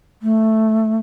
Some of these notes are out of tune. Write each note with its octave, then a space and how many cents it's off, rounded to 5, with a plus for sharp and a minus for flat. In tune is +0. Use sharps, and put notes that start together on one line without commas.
A3 +0